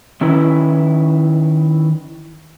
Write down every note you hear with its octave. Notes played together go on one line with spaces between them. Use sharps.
D#3 C#4 E4 B4